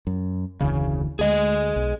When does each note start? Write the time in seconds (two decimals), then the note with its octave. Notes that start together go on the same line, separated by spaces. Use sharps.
0.07 F#2
0.61 F1 D2 C#3 E3
1.19 D2 G#3 G#4 D#5
1.76 B1